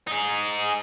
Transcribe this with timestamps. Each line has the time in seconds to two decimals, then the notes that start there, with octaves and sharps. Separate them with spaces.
0.07 D#4 G#4